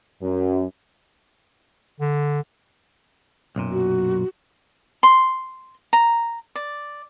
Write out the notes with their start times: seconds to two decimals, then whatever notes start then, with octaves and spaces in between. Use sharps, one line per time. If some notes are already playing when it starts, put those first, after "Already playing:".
0.22 F#2
2.00 D3
3.56 B1 F#2 A#2
3.72 F#4
5.03 C6
5.93 A#5
6.56 D5